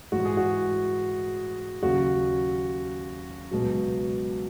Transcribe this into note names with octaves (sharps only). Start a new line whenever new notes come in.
G#2 E3 F#4
G#4
F#4
D#2 C#3 F#3 F#4
C#2 B2 F#3